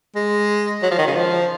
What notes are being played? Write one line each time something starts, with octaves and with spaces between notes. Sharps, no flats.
G#3
F#3
F3
D#3
C#3
F3